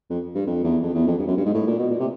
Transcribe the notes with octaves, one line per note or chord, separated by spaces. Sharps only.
F2
G2
F2
E2
F2
E2
F2
G2
F#2
G2
G#2
A2
A#2
B2
A#2
C3